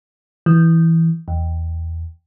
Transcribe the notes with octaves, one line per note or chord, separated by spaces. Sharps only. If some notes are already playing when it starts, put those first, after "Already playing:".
E3
E2